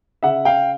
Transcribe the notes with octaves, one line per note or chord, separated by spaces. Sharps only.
C#3 E5 F#5
F5 G5